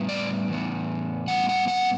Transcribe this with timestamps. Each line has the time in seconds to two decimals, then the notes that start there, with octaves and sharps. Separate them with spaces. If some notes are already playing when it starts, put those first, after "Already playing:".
Already playing: A2 G3 B3
0.09 D5
0.48 A2 E3 B3
1.28 A2 G3 B3 F#5
1.49 F#5
1.68 F#5